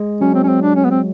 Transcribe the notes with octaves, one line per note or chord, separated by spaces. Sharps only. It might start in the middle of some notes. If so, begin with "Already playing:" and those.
Already playing: G#3
F#3 C#4
C4
C#4
C4
D4
C#4
B3
C4